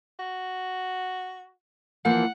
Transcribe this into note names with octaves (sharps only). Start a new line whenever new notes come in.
F#4
E3 F3 A#3 F#5